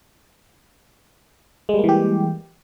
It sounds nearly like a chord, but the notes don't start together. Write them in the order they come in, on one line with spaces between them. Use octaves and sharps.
G#3 G3 A#3 E3 G4